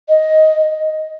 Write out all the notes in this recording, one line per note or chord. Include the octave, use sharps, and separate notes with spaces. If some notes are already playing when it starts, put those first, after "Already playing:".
D#5